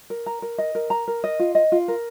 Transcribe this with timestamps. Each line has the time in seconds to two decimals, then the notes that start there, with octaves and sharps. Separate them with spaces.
0.10 A#4
0.26 A#5
0.42 A#4
0.58 D#5
0.75 A#4
0.90 A#5
1.08 A#4
1.24 D#5
1.39 F4
1.55 D#5
1.72 F4
1.88 A#4